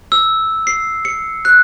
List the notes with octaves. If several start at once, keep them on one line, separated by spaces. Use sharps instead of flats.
E6
C7
C#7
F#6